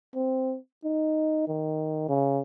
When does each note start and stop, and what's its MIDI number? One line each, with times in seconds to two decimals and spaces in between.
0.15 0.57 60
0.84 1.43 63
1.48 2.06 51
2.09 2.41 49